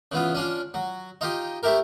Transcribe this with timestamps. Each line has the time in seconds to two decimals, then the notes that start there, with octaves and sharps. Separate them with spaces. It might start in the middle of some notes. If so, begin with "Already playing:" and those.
0.12 C#3 E3 B3 F4
0.35 C#4 D4 F4
0.74 F#3
1.21 D#4 F4 G4
1.63 A3 E4 G4 A#4